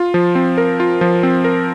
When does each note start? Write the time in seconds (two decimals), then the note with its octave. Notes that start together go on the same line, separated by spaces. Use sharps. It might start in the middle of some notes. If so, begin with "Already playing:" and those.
Already playing: F4
0.14 F3
0.35 C4
0.58 A#4
0.80 F4
1.01 F3
1.23 C4
1.44 A#4